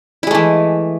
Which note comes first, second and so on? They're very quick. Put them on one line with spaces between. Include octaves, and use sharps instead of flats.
E4 G#3 A3 E3